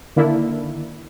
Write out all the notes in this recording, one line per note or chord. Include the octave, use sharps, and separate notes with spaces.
D3 D#3 A#3 D4 E4